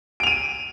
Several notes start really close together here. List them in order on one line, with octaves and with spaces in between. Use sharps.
D7 F7 D#7